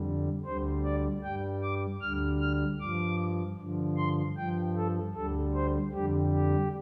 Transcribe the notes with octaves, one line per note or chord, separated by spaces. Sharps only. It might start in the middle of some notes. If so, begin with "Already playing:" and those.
Already playing: F2 D3 G3
D2 D3 G3 C5
D5
G2 G3 G5
D6
D2 D3 G3 F6
F6
G2 F3 D6
G2 D3 F3
C6
G2 F3 G5
A4
D2 D3 G3 A4
C5
F2 D3 G3 G4
G4